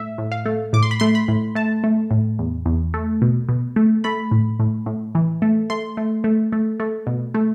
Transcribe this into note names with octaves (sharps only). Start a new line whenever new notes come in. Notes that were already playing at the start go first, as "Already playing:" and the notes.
Already playing: A2 E5
A2
F5
A3
A2 D6
C6
B5
A3 C6
B5
A2
A3 A5
A3
A2
E2
E2
A3
B2
B2
A3
A3 B5
A2
A2
A2
E3
A3
A3 C6
A3
A3
A3
A3
B2
A3